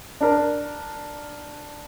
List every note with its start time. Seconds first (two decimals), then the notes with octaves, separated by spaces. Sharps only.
0.21 D4 A#4